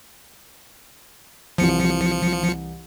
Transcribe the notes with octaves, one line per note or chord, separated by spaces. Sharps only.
C2 E3 F3 C#7